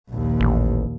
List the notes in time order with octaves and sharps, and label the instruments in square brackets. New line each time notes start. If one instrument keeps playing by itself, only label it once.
[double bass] A#1 D#2
[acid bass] A1